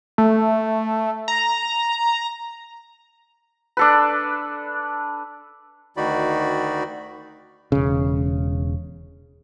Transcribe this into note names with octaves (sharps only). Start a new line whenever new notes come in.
A3
A#5
D4 A4 B4
D2 D#3 D#4 F#4 D5 B5
E1 C#3